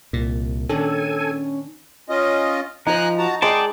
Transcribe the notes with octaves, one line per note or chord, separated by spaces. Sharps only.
C2 A#2
D#3 C#4 D4 A4 G#5
C#4 F4 D#5
F3 D#4 G#5 A#5 E6 F#6
F#4 A5 A#5
G#3 D5 G5 A5 C6 C#6 D#6